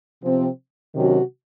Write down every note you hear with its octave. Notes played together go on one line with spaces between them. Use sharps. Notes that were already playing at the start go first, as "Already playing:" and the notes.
C3 F3 C4
C3 D#3 F#3 C#4 F#4